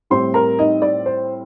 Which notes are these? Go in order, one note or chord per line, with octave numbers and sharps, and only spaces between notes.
A2 G3 C4 C5 C6
A#4 A#5
D#4 D#5
D5
C5